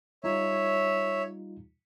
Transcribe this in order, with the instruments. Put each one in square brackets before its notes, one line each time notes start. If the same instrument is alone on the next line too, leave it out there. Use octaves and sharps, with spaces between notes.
[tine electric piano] G3 D#4 F4 [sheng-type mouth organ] C#5 E5